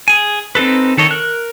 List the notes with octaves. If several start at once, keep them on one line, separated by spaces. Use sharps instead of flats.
G#4 G#5
C4 D#4 A4 B4
D#3 A4 C#5 D#5
A#4 F#6